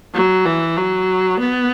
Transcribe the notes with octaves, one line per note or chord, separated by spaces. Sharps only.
F#3
E3
F#3
B3